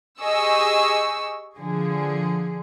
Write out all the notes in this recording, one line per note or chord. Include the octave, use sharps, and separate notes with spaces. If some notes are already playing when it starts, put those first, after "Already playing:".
G4 G#4 D#5 C#6 E6
D3 F3 G#4